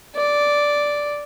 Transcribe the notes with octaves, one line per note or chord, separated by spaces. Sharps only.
D5